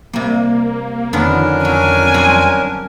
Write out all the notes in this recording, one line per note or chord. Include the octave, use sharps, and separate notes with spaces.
C3 G3 A#3
F2 D3 D#3 B3 C#4 D4 A#4
F#3 G#5
F#3 G3 C4